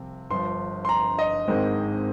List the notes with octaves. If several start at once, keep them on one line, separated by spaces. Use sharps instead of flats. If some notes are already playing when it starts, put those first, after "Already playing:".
Already playing: C2 C3 F3 C4
G1 G2 F3 C6
C6
A#5
D#5
G#1 G#2 D#3 G#3 C4